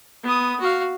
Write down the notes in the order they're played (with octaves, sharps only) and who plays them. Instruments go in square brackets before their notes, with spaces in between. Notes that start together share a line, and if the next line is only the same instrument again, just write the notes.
[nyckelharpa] B3 D#6
F#4 F5